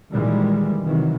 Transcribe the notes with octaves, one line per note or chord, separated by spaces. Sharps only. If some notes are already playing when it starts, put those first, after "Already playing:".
A#2 D#3 E3 G3 G#3
C3 D#3 E3 F#3